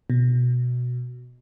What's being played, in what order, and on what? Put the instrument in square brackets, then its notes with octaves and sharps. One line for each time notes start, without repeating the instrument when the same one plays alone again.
[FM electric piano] B2